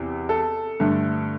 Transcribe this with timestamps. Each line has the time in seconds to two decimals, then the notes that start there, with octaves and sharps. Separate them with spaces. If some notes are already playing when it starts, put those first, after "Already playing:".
Already playing: E2 C3
0.29 A4
0.80 G2 D3 A3